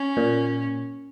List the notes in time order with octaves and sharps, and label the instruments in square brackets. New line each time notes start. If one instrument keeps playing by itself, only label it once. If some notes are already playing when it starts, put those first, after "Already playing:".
Already playing: [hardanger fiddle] C#4
[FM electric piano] A#2